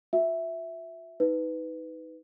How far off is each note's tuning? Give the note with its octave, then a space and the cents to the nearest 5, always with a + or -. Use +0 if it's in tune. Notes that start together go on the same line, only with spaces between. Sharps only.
F#4 -45 E5 +0
D#4 +25 B4 +15